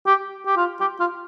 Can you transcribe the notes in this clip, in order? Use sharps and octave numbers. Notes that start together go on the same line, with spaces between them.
G4
G4
F4
G4
F4